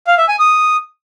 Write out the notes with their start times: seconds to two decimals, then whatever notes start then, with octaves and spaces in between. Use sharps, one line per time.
0.07 F5
0.18 E5
0.29 G#5
0.39 D#6